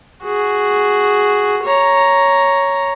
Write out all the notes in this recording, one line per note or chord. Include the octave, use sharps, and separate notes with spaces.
F#4 G#4
C#5 A#5